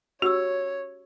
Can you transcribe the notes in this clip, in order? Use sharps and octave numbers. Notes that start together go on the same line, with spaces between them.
C#4 F#4 G4 C#5 E6